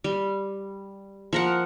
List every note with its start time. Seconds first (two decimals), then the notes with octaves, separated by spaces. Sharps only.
0.04 G3
1.33 F3 A#4 F#5